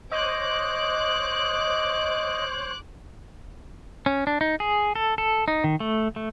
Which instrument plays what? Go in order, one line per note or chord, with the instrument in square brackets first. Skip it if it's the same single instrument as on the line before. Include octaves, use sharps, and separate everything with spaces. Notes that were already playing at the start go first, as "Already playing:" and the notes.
[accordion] C5 C#5 [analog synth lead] D#5 [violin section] D6 F#6
[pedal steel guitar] C#4
D4
D#4
G#4
A4
A4
D#4
D#3
A3
A3